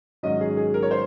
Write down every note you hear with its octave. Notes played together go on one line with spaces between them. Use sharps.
G#2 D#3 F#3 C#4 D#5
G#4
G#4
A#4
C#5
C5